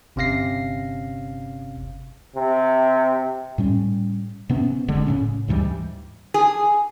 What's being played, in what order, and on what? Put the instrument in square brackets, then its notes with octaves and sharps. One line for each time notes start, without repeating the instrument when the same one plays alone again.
[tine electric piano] G1 C3 C#4 F5 A#6 C7
[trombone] C3
[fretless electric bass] A2 G3 C#4
C3 B3 C#4
F1 D3 G#3
A2 C#3 C#4
D2 G#2 E3 G3
[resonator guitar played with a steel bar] G#4